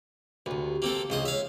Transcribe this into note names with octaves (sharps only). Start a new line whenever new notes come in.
D2 C3 B4
A#3 C4 A4
C#2 F4 G4 G#4 C5 D#5
C#5 E5 F5